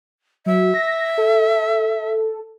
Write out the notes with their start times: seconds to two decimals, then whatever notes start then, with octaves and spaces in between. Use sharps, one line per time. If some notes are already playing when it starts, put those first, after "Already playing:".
0.46 F#3 E5
0.74 A#6
1.18 A4